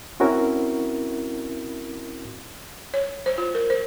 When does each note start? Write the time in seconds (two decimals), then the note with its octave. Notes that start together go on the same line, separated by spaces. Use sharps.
0.20 C4 C#4 E4 F#4 A#4
2.94 C#5
3.26 C5
3.38 F4
3.55 A#4
3.70 C5